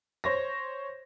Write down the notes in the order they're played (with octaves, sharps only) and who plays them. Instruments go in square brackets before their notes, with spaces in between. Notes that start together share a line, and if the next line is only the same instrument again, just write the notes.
[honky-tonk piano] C5 C#5 A#6